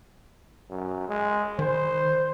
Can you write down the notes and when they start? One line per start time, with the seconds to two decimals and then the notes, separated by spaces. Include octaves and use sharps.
0.70 F#2
1.09 G#3
1.59 D#3 C5